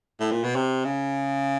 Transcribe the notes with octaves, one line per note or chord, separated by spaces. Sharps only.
A2
A#2
B2
C3
C#3